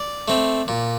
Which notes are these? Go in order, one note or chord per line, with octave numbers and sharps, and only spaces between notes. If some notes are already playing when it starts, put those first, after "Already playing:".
Already playing: D5
A3 C4
A#2